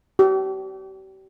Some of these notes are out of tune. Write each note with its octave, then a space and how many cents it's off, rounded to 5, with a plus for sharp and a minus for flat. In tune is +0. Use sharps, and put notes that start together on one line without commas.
G4 -40